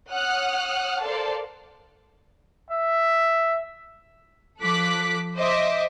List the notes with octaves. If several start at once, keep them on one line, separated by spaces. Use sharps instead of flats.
C#5 F#5 D#6 F6 F#6
A4 A#4 C5 D5 F5 A5
E5
F3 A4 D6 F#6 B6
C5 D#5 E5 D6